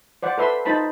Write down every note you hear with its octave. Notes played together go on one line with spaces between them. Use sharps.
C5 D5 F#5
A4 B4 E5 C6
D#4 C5 A5 B5